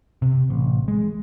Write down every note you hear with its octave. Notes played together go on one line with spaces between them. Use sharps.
C3
A1
G#3